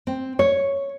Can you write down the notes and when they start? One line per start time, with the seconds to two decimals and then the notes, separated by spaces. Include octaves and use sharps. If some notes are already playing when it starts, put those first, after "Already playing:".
0.07 C4
0.39 C#5